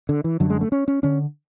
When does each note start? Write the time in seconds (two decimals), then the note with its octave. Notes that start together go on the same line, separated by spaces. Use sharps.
0.09 D3
0.24 E3
0.40 F#2 D3 F#3
0.50 G#3
0.61 A3
0.72 C#4
0.88 C#4
1.03 D3 C#4